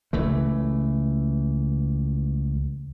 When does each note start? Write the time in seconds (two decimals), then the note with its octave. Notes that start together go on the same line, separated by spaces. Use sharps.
0.13 C#2 E3 A3